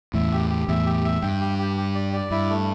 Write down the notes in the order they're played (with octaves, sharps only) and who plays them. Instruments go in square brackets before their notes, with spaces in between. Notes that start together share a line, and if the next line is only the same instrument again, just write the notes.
[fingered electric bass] E2 A2 [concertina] E5
[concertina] G4
G4
[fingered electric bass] E2 A2 [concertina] E5
[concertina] G4
E5
[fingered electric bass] G2 [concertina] G5
[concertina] G4
G4
G4
D5
D5
[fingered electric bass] G2 [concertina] E4
[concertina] A3